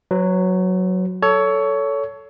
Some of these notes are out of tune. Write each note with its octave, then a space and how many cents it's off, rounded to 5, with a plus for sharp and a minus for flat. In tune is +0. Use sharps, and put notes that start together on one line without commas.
F#3 +0 B4 +40
A4 +0 C#5 +20